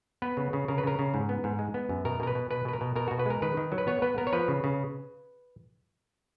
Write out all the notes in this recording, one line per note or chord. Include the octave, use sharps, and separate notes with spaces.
B3 B4
C#3
C#3
C#3 A#4
B4
C#3 A#4
C#3
G#2
B3
G#2
G#3
B3
F#2
B2 A#4
B2 A#4
B4
B2
B2 B4
B2 B4
A#4
B2
B2 A#4
B2 F#4
B4
G#3 A#4
D#3 B4
D#3
F#3
B4
B3 C#5
B3 B4
B3 A#4
C#5
F3 B4
C#3
C#3